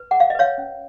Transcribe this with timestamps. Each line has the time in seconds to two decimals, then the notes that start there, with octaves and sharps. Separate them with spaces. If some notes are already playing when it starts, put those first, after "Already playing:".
Already playing: B4
0.11 G#4 F#5
0.20 F5
0.30 D#5
0.35 B4 C#5 F5
0.58 C#4